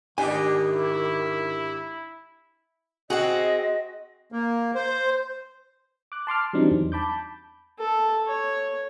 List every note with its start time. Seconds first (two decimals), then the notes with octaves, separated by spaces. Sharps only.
0.18 G#2 D#3 D4 G4 D#5 G#5
0.72 E4
3.10 C4 F#4 G#4 D#5 F#5
4.32 A#3
4.75 C5
6.12 D6 F#6
6.27 A5 C6 D6 F6
6.53 E3 F#3 G3 C4 D4 D#4
6.71 E2
6.92 A5 B5 D6 G6
7.79 A4
8.27 C#5